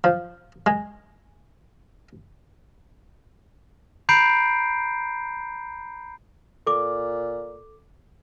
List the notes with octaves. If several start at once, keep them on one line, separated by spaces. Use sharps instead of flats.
F3
G#3
A#5 B5 G6 C7 D7
A#2 A4 D6